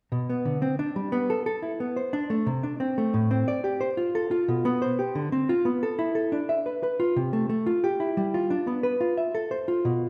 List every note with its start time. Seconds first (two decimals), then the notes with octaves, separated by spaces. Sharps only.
0.12 B2
0.30 B3
0.45 D3
0.62 C4
0.79 D4
0.96 G3
1.12 B3
1.30 A4
1.46 A4
1.62 E4
1.80 B3
1.96 C5
2.13 D4
2.30 A3
2.46 C3
2.63 D4
2.80 C4
2.98 A3
3.14 A2
3.31 C4
3.48 D5
3.64 G4
3.81 C5
3.97 F4
4.15 A4
4.31 F4
4.48 B2
4.65 B3
4.82 C5
4.99 G4
5.15 D3
5.32 C4
5.49 F4
5.65 B3
5.83 A4
5.99 E4
6.15 A4
6.32 D4
6.49 E5
6.66 B4
6.83 B4
7.00 F4
7.16 C3
7.33 A3
7.49 A3
7.66 F4
7.84 G4
8.00 E4
8.17 G3
8.34 F4
8.50 D4
8.67 B3
8.83 B4
9.01 F4
9.17 E5
9.35 A4
9.51 C5
9.68 F4
9.85 B2